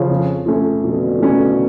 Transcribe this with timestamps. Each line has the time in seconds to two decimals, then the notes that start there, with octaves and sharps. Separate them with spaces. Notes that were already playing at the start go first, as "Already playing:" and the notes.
Already playing: C#3 F3
0.10 F2
0.46 F3 A3 C#4
0.83 F2 B2 D3
1.19 F3 A3 C#4